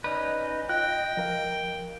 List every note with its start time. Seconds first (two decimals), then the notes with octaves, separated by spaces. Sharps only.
0.04 C#4 D#4 B4 D5 D#5
0.69 F4 G5 F#6
1.17 F3 A#4 F5